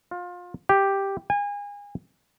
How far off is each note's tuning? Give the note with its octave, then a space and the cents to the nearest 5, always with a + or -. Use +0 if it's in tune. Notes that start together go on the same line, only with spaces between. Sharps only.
F4 +25
G4 +0
G#5 -30